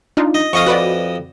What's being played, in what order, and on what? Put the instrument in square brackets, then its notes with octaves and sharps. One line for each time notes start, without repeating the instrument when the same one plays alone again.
[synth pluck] D4 D#4 F4
[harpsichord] D#5
[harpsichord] F2 D#5 D#6 [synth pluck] F5 C#6
[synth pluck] F#4 B4 D5